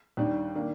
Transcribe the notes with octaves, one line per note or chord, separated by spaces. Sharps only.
D#2 D#3 G3 D4
D#3 A#3 D4